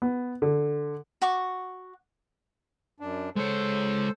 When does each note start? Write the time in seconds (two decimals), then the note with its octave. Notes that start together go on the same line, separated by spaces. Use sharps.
0.02 B3
0.42 D3
1.22 F#4 F#5 C#6 D6
3.00 F#2 D4
3.36 G#3 A4 C5 C#5